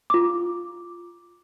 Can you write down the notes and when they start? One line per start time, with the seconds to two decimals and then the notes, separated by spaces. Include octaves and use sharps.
0.10 F4 D6